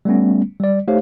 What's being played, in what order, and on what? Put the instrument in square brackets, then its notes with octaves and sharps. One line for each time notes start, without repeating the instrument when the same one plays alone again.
[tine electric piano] G3 A3 B3 C#4
G3 D5
A3 D#4 G4 C5 C#5 F5